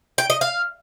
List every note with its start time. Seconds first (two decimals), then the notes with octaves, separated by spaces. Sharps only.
0.18 G5
0.30 D#5
0.41 F5